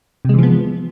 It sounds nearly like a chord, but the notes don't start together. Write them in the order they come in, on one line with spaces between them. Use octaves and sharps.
C3 G#3 E3 F3 B3